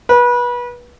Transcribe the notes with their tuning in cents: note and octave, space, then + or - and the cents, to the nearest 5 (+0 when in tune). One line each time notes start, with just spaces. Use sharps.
B4 -25